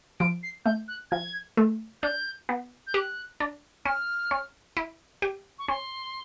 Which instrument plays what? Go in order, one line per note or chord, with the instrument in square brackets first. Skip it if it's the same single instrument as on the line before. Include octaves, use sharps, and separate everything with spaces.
[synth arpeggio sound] F3 [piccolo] D7
[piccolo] C7
[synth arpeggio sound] A3 [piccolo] G6
[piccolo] F#6
[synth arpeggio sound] F3 [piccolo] G#6
[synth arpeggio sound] A3
[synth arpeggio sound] D4 [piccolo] G6
[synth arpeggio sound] B3
[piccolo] G6
[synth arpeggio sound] G4 [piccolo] F#6
[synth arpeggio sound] D4
[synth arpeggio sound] C#4 [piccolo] F6
[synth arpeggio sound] C#4
E4
G4
[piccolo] C#6
[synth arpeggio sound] C#4 [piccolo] C6